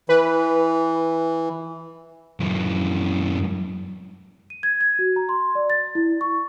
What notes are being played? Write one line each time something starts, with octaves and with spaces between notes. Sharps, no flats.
E3 B4
F#2 E3
D#7
G#6
G#6
F#4
A#5
C6
D5
A6
E4
C#6